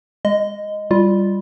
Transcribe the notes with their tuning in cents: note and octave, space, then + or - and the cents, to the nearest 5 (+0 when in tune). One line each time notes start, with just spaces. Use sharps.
G#3 -25 D#5 +0
G3 +0 F4 +0